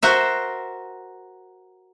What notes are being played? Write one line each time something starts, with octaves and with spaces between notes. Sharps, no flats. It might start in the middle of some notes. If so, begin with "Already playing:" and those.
F#4 A#4 C5 E5